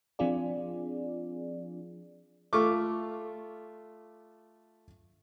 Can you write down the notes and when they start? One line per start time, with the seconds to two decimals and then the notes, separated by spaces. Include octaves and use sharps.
0.19 F3 C4 D4 F4 G#4 D5
2.53 A3 F4 C#6 D6